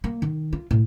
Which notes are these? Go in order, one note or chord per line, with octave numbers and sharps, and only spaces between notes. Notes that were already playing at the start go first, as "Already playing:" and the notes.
A#3
D#3
F4
A2